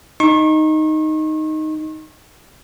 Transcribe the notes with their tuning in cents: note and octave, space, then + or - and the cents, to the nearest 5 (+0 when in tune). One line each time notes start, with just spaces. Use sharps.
D#4 +0 C#6 -40